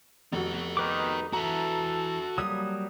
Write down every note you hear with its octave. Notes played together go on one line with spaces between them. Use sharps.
F1 B3 F#4 A4
D#3 D#4 B4 D6
E3 F#4 A4 E5 A#5
F#3 G3 A#3 D#6